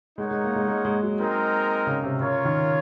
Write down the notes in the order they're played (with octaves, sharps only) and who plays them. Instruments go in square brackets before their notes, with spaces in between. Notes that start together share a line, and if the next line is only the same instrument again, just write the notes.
[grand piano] G#3 [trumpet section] D#4 A#4 C#5 F#5
[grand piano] G#3
A#3
G#3
G#3
G#3
F#3
[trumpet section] G#3 C4 D#4 A#4
[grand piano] C#3
C3
[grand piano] C#3 [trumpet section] F4 A#4 C#5
[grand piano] D#3